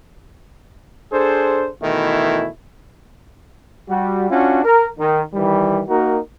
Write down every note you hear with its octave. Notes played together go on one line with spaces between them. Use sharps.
D4 G#4 A4 C5
B2 D#3 E3 A3 E4
G3 F#4
C#4 D4 F4 F#4
A#4
D#3
D#3 E3 G3
A#3 D#4 F#4 A#4